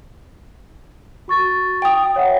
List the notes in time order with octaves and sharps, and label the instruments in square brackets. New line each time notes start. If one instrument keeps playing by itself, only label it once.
[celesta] F#4 C#6 A6
[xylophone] G5 D#6
[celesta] C#5 E5 F#5